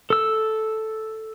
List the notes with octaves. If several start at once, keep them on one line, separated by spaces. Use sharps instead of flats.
A4 E6